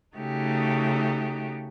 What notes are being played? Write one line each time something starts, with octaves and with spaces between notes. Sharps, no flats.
C#3 A3 D#4 F#4 G4